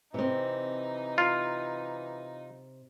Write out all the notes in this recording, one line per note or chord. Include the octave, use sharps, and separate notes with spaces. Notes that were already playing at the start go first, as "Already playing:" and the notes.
C3 E3 C4 D#4
F4